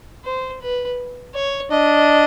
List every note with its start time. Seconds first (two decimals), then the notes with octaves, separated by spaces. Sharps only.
0.25 C5
0.62 B4
1.35 C#5
1.71 D4 D#5